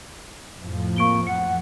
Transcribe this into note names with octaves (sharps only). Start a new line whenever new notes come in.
F2 A2 F3
A#3 C#6 D7 G7
F#5 C#7